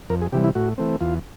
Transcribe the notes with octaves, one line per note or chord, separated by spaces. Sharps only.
F2 A#4
G#4
C3 E3 G3 G4
E4
A2 F#4
E3 A3 C4
E2 F4